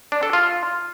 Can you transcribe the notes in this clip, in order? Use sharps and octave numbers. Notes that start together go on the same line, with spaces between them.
D4
A4
F4